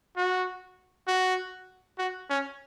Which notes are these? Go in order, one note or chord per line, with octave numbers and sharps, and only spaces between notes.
F#4
F#4
F#4
C#4